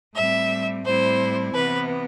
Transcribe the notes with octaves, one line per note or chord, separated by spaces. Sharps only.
A2 G3 C4 E5
A2 G3 C4 E4 C5
C3 E3 B3 B4